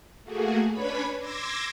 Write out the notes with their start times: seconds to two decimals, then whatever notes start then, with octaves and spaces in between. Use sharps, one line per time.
0.23 A3 A#3 F#4 G#4
0.71 C#4 D4 B4 C#5 B5
1.18 C6 D6 E6 G#6 A#6